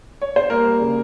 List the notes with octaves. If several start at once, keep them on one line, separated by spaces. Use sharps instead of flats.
C#5
C5
G3 A#3 A#4
G3
C#3